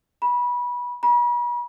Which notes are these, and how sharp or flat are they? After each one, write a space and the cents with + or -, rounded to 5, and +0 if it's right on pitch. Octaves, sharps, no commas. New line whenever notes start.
B5 -20
B5 -40